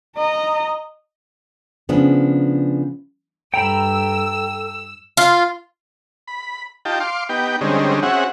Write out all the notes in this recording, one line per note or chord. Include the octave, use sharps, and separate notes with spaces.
D#5 A#5
C#3 F3 B3 D4
G2 A4 G5 A#5 B5 E6
F4
B5
D#4 F4 G4 G5 A5
F5 C6 D6
B3 D#4 G4 G5
D3 G3 G#3 C4 C#4 D#4
C4 C#4 F#4 G#4 E5 F#5